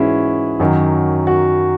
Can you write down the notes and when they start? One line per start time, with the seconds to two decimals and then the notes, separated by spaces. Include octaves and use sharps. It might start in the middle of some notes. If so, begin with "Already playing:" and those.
Already playing: G#2 E3 G#3 C#4 E4 F#4 G#4
0.60 F#2 D#3 F#3
1.27 F#4